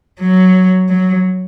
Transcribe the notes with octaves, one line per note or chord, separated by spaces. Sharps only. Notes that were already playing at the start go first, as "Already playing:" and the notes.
F#3
F#3